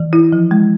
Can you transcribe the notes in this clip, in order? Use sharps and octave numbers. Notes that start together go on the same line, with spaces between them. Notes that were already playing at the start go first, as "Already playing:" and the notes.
Already playing: E3
E4
F3
G#3